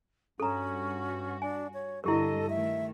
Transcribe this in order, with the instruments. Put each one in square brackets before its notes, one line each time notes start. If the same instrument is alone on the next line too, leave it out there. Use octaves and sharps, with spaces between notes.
[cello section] G2 F#4 [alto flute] C#4 [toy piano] A4 A#5
[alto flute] D4 [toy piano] G#5
[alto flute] C#5
[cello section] G2 D3 D#5 [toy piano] E4 G4 A#4 [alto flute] A4
[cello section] D#3 A3 [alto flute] E5